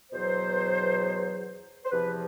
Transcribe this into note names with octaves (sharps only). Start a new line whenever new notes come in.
E2 B2 F#3 C5
C5
E2 C3 F3 B4